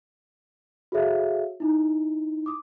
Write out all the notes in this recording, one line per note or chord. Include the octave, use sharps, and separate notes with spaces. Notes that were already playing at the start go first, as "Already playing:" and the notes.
F#4 G#4 A4 C#5 E5 F5
D#4 E4
D6 D#6